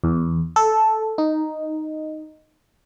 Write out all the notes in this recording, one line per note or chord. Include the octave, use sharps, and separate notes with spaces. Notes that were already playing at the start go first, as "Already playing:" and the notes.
E2
A4
D#4